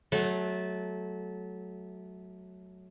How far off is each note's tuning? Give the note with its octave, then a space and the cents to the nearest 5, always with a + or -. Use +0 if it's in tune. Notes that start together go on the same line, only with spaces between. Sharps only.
F#3 +0 A3 -20